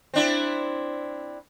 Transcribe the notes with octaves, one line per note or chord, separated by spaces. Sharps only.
C4 D4 E4